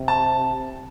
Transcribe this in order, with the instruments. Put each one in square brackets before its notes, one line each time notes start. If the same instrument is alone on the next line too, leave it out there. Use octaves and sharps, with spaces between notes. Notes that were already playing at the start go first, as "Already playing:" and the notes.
Already playing: [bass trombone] C3
[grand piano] A5